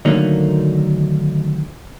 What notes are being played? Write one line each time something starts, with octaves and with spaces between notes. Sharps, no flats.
D3 D#3 F#3 A3 A#3 D#4